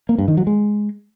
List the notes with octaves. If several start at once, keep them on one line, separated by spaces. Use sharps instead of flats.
A#3
G2
D#3
F#3
G#3